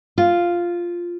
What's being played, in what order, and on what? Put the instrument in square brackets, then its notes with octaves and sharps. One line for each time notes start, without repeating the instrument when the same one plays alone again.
[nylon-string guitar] F4